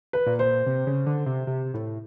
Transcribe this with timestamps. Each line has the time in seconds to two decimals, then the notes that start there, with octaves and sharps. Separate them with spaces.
0.13 B4
0.26 A#2
0.39 C5
0.66 C3
0.87 C#3
1.06 D3
1.26 C3
1.47 C3
1.74 A2